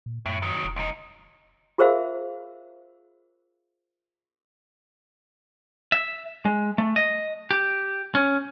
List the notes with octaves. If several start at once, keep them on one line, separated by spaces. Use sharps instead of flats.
A#2
F#2 A2
D#3 F#3
E1
C#2 D#4
F4 G#4 A#4 C5 E5 F5
E5
G#3
A3
D#5
G4
C#4